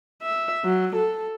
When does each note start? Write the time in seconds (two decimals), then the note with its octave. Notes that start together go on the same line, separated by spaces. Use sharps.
0.23 E5
0.65 F#3
0.96 A4